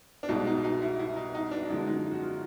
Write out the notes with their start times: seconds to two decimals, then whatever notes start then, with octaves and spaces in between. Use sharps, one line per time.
0.23 D4
0.29 C2 B2 G#3 D#4
0.47 D#4
0.64 D#4
0.82 E4
0.99 E4
1.16 D#4
1.35 D#4
1.51 D4
1.69 F#2 D3 F3 G#3 D#4
1.87 D#4
2.11 F#4
2.22 F4